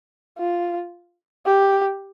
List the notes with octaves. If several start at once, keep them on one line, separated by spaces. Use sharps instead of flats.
F4
G4